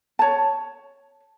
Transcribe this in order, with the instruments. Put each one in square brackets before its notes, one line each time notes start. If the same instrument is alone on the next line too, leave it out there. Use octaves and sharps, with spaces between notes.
[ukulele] C#5 A5